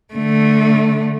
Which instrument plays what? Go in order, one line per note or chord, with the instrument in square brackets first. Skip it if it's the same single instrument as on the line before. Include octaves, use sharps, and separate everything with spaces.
[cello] D3 A3